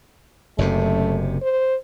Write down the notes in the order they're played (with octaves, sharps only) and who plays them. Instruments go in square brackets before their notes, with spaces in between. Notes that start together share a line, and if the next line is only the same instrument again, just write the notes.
[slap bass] F#1 F#2 C3 [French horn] A3
[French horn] C5